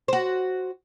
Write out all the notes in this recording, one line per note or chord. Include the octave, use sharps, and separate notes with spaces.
F#4 C5